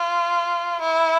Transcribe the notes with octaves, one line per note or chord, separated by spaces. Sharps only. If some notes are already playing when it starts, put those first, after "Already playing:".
Already playing: F4
E4